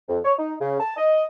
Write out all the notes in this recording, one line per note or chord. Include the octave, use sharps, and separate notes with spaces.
F2
C#5
D#4
C#3
A5
D#5